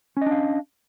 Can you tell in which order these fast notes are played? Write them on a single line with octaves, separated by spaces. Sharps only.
C#4 D#5 D4 F5